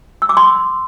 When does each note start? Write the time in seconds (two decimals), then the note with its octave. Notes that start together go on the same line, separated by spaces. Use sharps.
0.22 E6
0.29 D6
0.37 C6